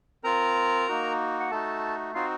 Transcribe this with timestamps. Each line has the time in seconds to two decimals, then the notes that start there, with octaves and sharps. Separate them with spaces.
0.24 C4 F4 A#4 A#5
0.88 A#3 D#4 F#4
1.40 F#5
1.51 A3 D#4 F#4 A4 A5
2.14 C4 D#4 F4 F#4 F5